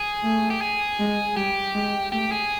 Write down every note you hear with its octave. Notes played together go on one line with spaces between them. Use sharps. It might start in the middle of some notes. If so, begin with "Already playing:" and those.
Already playing: G#4
A3
G4
G#4
G#3
G3 G4
G#3
A3 G4
G#4